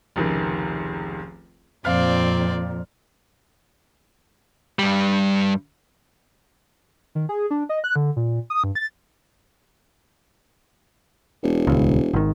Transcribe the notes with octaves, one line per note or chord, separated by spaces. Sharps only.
F1 C#2 D#3
F2 A#2 C4 D5 F5 F6
G2 G3
D#3
G#4
D4
D#5
F#6
D3
A#2
D#6
G2
A6
E1
D#1 C#2
G#1 D#3